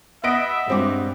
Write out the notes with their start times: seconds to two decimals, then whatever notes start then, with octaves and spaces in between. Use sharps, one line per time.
0.24 B3 D#5 E5 D7
0.68 G2 G#3 C4 D6